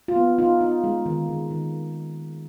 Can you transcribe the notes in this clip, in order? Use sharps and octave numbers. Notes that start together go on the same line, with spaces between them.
F4
B3
D#4 F4
D#4
G#3
D#3
D#3
D#3